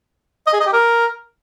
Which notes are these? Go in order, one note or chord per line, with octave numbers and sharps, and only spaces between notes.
D#5
G#4
D#5
G4
A#4